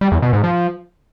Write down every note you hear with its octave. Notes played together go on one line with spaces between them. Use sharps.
G3
E2
B2
G#2
F3